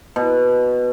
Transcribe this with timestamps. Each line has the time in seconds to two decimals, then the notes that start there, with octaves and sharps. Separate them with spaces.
0.16 B2